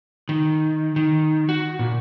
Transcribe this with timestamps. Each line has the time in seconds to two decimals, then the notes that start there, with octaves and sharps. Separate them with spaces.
0.29 D#3
0.96 D#3
1.49 F#4
1.79 A#2